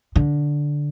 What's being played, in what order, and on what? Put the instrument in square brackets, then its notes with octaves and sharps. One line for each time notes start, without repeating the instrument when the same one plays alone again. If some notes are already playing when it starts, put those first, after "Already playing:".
[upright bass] D3